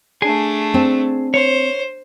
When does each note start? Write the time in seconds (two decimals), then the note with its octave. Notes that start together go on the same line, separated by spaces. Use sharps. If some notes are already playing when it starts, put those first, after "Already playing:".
0.22 A3 D4 G#4 G#5
0.74 C4
1.34 C5 C#5